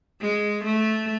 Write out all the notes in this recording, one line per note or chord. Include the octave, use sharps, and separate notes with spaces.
G#3
A3